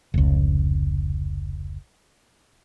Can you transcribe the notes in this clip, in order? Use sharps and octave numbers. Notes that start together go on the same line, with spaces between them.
F1 C#2